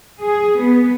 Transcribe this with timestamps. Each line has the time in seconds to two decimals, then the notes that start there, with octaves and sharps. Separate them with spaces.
0.22 G#4
0.61 B3